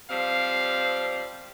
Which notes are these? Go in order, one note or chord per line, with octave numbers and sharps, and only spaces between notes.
F3 G3 C4 F5